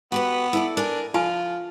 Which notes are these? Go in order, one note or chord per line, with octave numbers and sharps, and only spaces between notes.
B3 F#4 G4 B4
E4 A4 D5
D4 A#4 G#5
F3 F4 F5 G#5 A5